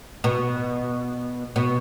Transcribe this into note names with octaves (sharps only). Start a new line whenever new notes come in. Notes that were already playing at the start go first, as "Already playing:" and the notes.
B2
B2